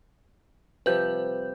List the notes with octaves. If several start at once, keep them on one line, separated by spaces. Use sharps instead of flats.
C3 F3 G3 B4 G6